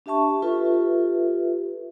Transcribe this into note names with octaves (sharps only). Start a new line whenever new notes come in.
D4 G4 E5 A5 C#6
F4 G4 A4 B4 E5